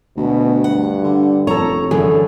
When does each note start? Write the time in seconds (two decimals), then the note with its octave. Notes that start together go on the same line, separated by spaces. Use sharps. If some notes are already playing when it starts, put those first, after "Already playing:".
0.17 D2 B2
0.64 G2 F#5
1.04 D3
1.47 F1 A4 C#5 A#5
1.91 F#2 D3 E3 G#4 A4